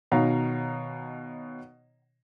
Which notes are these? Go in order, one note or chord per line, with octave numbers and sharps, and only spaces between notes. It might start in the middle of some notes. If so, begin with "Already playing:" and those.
B2 D#3 C#5 F5 A#5